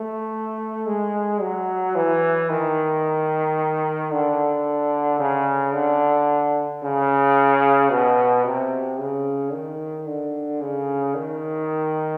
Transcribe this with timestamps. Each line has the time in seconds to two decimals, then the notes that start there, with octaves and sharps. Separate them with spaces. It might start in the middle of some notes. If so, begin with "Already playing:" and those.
Already playing: A3
0.87 G#3
1.41 F#3
1.95 E3
2.50 D#3
4.12 D3
5.19 C#3
5.73 D3
6.83 C#3
7.90 B2
8.45 C3
8.99 C#3
9.53 D#3
10.07 D3
10.61 C#3
11.15 D#3